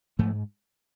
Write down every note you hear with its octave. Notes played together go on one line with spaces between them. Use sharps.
G#2 F3 A3